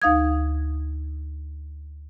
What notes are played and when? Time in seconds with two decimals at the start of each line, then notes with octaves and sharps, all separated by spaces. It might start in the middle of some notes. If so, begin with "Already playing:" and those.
0.02 D2 D#4 F5 D#6 G#6